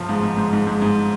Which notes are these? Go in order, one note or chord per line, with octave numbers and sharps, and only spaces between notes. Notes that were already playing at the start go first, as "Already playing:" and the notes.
Already playing: G1 F3
G#2
G#2
G#2
G#2
G#2
G#2